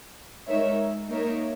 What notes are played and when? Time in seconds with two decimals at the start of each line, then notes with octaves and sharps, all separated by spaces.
0.47 G#3 D#4 A#4 C#5 E5
1.08 A#3 D#4 A#4 C#5 E5